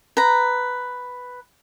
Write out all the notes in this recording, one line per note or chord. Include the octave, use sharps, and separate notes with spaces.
B4 A#5